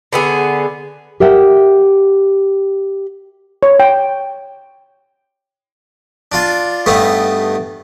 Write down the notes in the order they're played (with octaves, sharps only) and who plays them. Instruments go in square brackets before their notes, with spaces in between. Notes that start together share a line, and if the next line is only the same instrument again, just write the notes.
[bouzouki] D3 B3 G#4
[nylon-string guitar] G4 A#4 E5 F#5 G5
[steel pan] C#5
G5
[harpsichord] D4 F4
G2 A3 B3 D#4